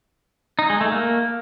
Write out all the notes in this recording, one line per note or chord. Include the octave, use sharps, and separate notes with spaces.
D#4
G#3
A3
A#3